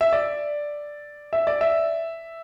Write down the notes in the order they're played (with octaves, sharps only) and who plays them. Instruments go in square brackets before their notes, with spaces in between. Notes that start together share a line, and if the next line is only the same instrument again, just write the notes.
[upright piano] E5
D5
E5
D5
E5